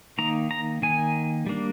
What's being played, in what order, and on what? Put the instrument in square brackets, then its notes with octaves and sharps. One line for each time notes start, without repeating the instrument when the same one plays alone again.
[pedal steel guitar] D#3 A#3 D#4 A#5
A#5
D#3 A#3 D#4 G#5
G3 A#3 D4